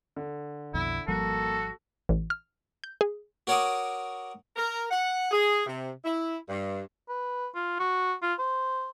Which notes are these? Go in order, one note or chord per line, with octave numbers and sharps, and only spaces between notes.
D3
B1 F2 B2 E4
G#1 F3 G3 A#3 F#4 A4
A1
F6
G6
G#4
F#4 A#4 C#5 F#5 D6 D#6
A#4
F#5
G#4
C3
E4
G2
B4
F4
F#4
F4
C5